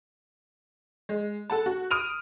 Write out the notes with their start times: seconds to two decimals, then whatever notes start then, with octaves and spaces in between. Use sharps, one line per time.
1.09 G#3
1.50 A4 F#5 A5
1.66 F#4
1.91 D#6 F6 D7 D#7 F7